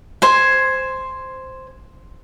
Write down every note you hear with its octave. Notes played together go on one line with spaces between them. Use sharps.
C5 G#5